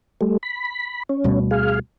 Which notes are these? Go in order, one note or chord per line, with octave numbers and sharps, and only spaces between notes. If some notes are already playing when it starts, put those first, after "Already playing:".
G3 A3
B5
C#4
D2 B2 G3
G#4 F5